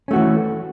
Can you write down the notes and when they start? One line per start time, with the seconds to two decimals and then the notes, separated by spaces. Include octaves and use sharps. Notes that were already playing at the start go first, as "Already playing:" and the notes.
0.08 C#4
0.11 A3
0.13 F#4
0.16 E3